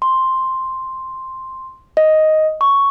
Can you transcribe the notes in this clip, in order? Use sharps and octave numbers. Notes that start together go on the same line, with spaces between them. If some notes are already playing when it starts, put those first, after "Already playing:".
C6
D#5
C#6